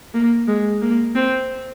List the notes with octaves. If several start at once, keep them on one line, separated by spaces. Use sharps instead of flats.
A#3
G#3
A#3
C4